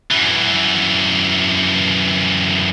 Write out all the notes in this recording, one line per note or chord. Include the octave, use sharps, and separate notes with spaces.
F#2 E3